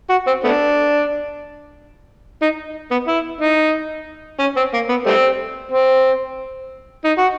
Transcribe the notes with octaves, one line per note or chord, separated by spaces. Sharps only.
F#4
C4
A3 B3 D4
D#4
B3
E4
D#4
C#4
C4
A#3
B3
G3 A3 C4
C4
D#4
F#4